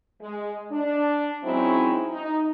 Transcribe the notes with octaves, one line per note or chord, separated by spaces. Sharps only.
G#3
D4
F#3 G#3 C4 C#4 D#4 E4
D#4